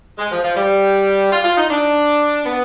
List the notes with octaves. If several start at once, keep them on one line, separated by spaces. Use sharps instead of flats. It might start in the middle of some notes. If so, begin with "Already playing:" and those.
G#3
F3
F3
G3
F4
F4
D#4
D4
B3